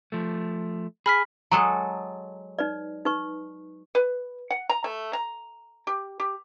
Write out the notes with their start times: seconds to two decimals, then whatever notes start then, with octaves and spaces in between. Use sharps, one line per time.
0.12 F3 A3
1.06 G#4 B5 F6 B6
1.51 F#3 G#3 A4 A#5
2.59 D#4 B4 D5
3.05 D#4 B4 C#6
3.95 B4
4.50 F#5
4.69 A#5
4.84 A3
5.13 A#5
5.87 G4
6.20 G4